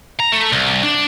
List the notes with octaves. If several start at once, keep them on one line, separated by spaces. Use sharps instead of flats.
A#5
A3
C2
D4